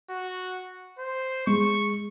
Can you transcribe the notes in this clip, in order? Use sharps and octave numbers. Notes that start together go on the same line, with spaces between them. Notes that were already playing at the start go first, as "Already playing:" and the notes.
F#4
C5
G#3 C#6